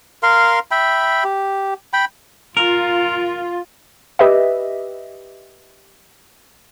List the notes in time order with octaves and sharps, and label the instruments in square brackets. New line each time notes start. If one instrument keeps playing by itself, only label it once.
[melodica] A#4 F5 C6
E5 G5 B5
G4
G5 B5
[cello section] F4 [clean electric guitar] A#4
[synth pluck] G4 B4 D#5 E5